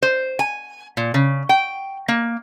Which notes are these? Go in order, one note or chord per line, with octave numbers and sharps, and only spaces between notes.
C5
G#5
A#2
C#3
G5
A#3